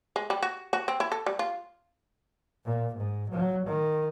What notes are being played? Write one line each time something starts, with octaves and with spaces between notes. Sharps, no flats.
G#3
G3
F#4
F#4
C4
E4
A4
G3
F4
A#2
G#2
F#3
D#3